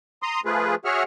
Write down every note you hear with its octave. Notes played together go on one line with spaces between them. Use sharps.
A#5 C6 D#6
F3 A3 F4 G#4 B4
F#4 G#4 C#5 E5 F#5 F6